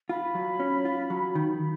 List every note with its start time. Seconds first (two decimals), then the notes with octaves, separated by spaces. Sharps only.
0.09 F4 B5
0.35 F#3
0.60 C#4
0.85 F4
1.10 F#3
1.35 D#3